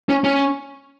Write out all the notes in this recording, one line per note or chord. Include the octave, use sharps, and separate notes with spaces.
C#4
C#4